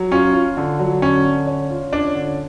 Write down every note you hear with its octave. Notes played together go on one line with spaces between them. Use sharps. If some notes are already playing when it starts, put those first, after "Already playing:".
Already playing: F#3
C#4 F4
F4
D3
F#3
D3 C#4
D3
C#4
F4
C#4 D4
D3